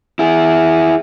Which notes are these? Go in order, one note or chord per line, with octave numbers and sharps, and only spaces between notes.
E4 G#4